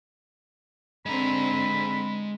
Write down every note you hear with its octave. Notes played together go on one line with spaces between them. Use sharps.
D3 G#3 C4 A#5 B5